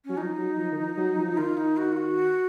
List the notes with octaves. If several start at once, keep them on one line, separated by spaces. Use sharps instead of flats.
F#3 C#4
F3 D#4
F#3
F3
D#3
F3
F#3
F3
F3
D#3 F4
D#4
F#4
F4
F#4